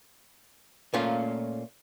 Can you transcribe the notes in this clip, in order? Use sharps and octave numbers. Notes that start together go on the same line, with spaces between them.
A#2 A3 A#3 C#4 F4